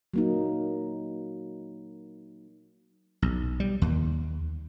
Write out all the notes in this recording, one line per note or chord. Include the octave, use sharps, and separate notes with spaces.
F#3 A#3 D#4
B1
G3
D#2